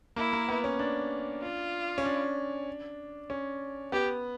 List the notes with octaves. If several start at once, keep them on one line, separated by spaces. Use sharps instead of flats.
A#3 E4
A#3
B3
C#4
D4
F4
C#4
D4
C#4
B3 G4